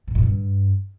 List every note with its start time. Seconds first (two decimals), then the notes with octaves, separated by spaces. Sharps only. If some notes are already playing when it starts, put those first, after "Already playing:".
0.07 B2
0.15 A#2
0.23 G2